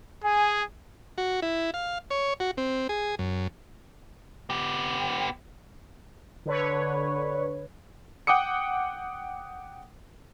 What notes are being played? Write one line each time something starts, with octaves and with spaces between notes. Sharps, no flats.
G#4 G#5
F#4
E4
F5
C#5
F#4
C4
G#4
F#2
B3 G4
D3 B4 C#5
F#5 G5 D6 D#6 C#7